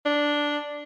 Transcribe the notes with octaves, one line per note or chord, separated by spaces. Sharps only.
D4